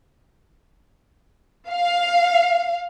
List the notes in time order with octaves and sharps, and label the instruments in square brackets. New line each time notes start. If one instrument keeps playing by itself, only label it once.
[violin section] F5